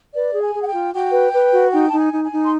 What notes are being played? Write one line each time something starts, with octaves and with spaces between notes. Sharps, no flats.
B4 D5
G#4
G#5
G#4
F#5
G5
F4
F#4 G5
B4
B4
F#4
D#4 G5
D#4 A5
G#5
D#4
G#5
D#4
C6